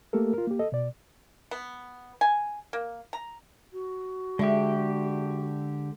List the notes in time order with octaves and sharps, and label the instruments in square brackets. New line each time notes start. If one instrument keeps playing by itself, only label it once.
[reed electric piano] A3 A#3 G4 A4 A#4
F4 A#4
A#3 G4
A4 D#5
B2 D5
[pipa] B3
G#5
A#3
A#5
[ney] F#4
[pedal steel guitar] D3 G4 [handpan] G#3 [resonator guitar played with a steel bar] D4 E5